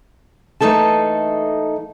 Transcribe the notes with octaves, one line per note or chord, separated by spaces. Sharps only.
E3 A3 A#3 D#4 A4 A5